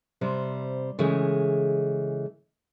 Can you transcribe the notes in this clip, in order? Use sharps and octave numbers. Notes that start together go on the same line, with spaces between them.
C3 G3 C5
C#3 E3 G#3 A3